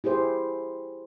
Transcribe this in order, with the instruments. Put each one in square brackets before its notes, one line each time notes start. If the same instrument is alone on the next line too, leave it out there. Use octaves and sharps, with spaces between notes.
[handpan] E4 G4 G#4 C5